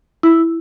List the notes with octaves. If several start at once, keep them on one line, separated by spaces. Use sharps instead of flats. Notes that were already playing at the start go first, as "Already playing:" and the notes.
E4